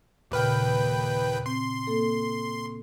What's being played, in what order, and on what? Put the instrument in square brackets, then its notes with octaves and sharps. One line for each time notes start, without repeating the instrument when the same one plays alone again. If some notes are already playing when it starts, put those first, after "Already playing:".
[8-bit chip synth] D#2 B4 G5 [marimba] A#2 C#3 F6
[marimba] C4 [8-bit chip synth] C6
[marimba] A#3 A4